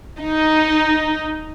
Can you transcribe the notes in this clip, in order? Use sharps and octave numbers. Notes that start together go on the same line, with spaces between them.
D#4